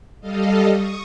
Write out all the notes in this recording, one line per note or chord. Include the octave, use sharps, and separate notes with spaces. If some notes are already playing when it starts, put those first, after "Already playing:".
G3 A4 D#5 F5
C#6 D#6